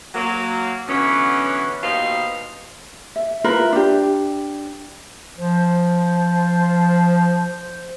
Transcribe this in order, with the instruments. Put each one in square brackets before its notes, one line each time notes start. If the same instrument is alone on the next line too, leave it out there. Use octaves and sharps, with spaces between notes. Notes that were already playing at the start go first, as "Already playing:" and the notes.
[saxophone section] F#3 A#3
D3 E3 F#3 B3 C#4
D#2 B2 D#4 C5 F5
[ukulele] E5
E4 F4 A#4 B4
D4 G4
[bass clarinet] F3 [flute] C5